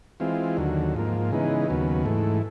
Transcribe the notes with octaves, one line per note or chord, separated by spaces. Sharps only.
E3 G#3 C4 F4
D#2 D3 F#3
G#2 F3 A#3
C#3 E3 G#3 B3 D#4
D#2 C#3 F#3 B3
G#2 E3 A3